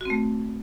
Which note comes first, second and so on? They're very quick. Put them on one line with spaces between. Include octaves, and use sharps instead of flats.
F#4 C4 A3